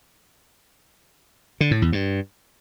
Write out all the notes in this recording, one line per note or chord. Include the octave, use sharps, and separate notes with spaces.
D3
A2
E2
G2